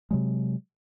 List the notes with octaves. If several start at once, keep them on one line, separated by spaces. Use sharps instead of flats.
C3 F#3 G#3